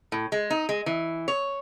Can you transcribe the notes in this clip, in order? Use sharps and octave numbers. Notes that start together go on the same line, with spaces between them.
A2
G#3
D#4
G#3
E3
C#5